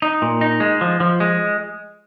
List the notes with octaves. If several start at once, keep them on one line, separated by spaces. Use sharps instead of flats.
D#4
A#2
D#4
G#3
F3
F3
G#3